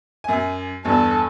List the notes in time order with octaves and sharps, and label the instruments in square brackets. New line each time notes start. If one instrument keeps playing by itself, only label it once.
[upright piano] F#2 G#5
[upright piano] E2 G2 [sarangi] A4